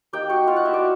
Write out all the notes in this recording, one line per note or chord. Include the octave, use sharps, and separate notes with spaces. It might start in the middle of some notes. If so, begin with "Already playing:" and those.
A#3 D#4 G4 G5
F#4 F#5
F4 F5
F#4 F#5
E4 E5
D5